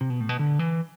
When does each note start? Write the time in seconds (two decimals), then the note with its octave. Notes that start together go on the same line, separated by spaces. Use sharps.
0.01 C3
0.10 B2
0.20 A2
0.29 B2
0.39 D3
0.59 E3